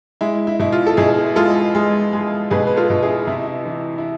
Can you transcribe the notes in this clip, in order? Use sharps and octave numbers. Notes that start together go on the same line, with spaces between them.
G#3 E4
E4
B2 E4
F4
A4
B2 E4 G#4
G#3 F4 A4
G#3
G#3
B2 G#4 B4
B4
F4 A4
B2
E4 G#4
C3 E4
E4
E3
E4